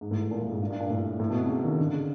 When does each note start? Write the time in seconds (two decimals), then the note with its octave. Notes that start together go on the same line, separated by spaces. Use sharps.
0.01 G#2
0.11 A2
0.22 A2
0.31 A#2
0.41 A2
0.51 G#2
0.60 G2
0.70 G2
0.80 A#2
0.90 A2
1.20 A2
1.30 B2
1.39 C3
1.49 C#3
1.63 D#3
1.79 D3
1.93 C#3